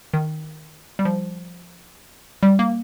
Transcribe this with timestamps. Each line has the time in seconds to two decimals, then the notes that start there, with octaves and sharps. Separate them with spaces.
0.14 D#3
0.99 G3
1.05 F3
2.43 G3
2.59 A#3